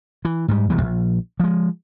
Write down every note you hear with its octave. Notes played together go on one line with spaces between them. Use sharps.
E3
G#2 G3
E1 E2 E3 G3
A#1
F3 G#3